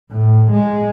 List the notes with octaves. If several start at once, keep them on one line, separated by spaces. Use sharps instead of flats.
A2
G#3